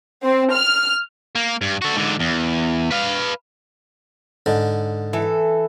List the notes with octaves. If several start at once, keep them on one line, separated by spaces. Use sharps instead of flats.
C4
F6
A#3
G2
A3 F#4
G#2 D3
E2
B4 F5
G#2 D3
E3 A4